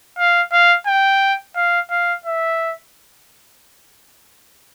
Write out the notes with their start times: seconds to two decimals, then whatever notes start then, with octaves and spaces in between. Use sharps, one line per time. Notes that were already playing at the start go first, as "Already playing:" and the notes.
0.18 F5
0.52 F5
0.87 G5
1.56 F5
1.90 F5
2.26 E5